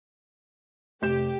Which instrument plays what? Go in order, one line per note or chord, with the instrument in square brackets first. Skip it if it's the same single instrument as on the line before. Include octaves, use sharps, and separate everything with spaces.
[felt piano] F1 G6 E7 [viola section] G4